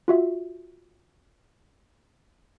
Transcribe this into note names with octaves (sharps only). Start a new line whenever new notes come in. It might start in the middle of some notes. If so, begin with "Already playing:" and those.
F4 F#4 E5